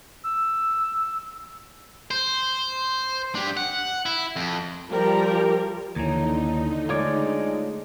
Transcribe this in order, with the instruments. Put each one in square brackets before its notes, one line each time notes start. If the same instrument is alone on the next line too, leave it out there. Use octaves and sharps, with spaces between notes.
[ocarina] E6
[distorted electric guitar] C5
D4 G4
F#5
E4
F2
[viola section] F3 G3 G4 A#4 A#5
[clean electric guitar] D#2 E3 [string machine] D3 D#4 [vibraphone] A#3 C#5 A#5
[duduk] G#3 [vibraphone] A3 G#4 [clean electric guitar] F4 C#5 D5